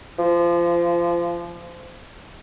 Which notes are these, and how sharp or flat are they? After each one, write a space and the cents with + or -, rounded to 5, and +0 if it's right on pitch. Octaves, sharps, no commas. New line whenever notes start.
F3 -25